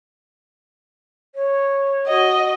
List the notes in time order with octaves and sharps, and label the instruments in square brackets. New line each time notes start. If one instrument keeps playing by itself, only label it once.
[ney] C#5
[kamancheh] F#4 D#5